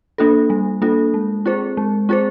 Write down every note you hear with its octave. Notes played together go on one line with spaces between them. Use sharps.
A#3 D4 F4 A4
G3
A#3 D4 F4 A4
G#3
C4 F4 G#4 C5
G#3
C4 F4 G#4 C5